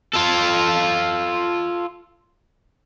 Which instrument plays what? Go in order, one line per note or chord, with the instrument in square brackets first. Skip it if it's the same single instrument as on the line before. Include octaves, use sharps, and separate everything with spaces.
[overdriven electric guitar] F4 A4